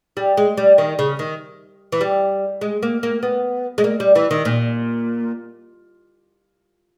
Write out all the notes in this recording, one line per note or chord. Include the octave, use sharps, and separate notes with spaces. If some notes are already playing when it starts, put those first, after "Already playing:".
G3
G#3
G3
D#3
C#3
D#3
E3
G3
G#3
A#3
A#3
B3
G#3
A#3
G3
E3
D#3
A#2